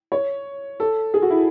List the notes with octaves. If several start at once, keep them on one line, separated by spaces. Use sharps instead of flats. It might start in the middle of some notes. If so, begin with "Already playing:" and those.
C#5
A4
G#4
F#4
E4